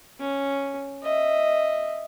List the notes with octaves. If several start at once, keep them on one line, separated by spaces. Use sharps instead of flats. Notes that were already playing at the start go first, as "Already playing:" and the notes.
C#4
D#5 E5